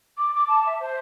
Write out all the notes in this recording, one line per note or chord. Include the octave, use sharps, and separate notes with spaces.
D6
D6
A5
E5
C5